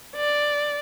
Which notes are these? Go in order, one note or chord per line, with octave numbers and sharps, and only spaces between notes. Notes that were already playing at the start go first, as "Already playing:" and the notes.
D5